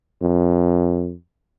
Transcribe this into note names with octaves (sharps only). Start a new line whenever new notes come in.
F2